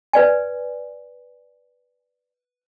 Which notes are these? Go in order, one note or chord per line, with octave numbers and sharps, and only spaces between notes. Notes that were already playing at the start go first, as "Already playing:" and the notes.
B4 D5 G#5